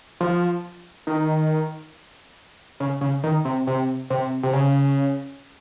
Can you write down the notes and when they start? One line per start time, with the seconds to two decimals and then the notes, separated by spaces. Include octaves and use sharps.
0.20 F3
1.07 D#3
2.80 C#3
3.01 C#3
3.23 D#3
3.45 C3
3.67 C3
4.10 C3
4.43 C3
4.53 C#3